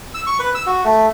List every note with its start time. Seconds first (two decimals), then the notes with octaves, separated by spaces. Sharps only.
0.14 E6
0.27 C#6
0.39 B4
0.55 E6
0.66 F#4
0.85 A3